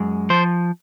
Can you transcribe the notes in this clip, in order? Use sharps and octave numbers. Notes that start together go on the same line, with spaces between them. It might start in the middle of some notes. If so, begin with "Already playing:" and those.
Already playing: F#2 G#3
F3 C5